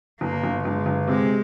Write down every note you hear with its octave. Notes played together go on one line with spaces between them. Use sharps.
G1 A#3
G1
G1 G#3
G1
C3 G#3